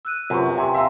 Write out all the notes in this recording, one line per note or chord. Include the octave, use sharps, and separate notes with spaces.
E6 F#6 D#7
F#2 C3 F4 B4 C#6
C3 G#5
E5 F5 A5 A#5 C6 E6